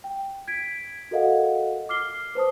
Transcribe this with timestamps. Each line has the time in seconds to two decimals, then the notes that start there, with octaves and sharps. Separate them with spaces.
0.04 G5
0.48 G#6 B6 D7
1.11 F#4 A4 A#4 D#5 F5 F#5
1.89 D6 F6 C7 G7
2.35 B4 C5 A5 D#6